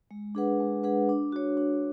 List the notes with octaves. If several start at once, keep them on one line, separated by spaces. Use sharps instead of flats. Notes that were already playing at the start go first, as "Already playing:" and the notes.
G#3
D4 G#4 B4 F#5
G#3
D4 G#4 B4 F#5
D4
F#4 C#5
D4